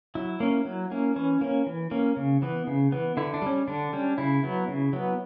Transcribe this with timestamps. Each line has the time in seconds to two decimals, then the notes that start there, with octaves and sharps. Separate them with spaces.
0.15 F#3 E4
0.40 A#3 C#4
0.65 F#3
0.91 A#3 C#4
1.16 E3 C#4
1.41 A#3 C#4
1.66 E3
1.91 A#3 C#4
2.16 C#3
2.42 E3 B3
2.67 C#3
2.92 E3 B3
3.17 D3 E4
3.34 D4
3.42 G3 C#4
3.68 D3 D4
3.93 G3 C#4
4.18 C#3 E4
4.44 F#3 B3
4.68 C#3
4.93 F#3 B3